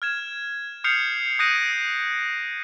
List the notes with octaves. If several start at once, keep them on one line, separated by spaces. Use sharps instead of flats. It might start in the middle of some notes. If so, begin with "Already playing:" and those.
F6 G#6 E7
D#6 F6 G6 C7 C#7 F7
D#6 F#6 G6 A#6 D7 D#7